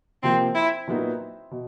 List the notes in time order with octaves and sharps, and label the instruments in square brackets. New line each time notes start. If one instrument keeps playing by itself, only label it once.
[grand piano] C3 F3 A#3 [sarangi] C4
[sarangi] E4
[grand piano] A#2 F#3 B3 D#4 F#4
B2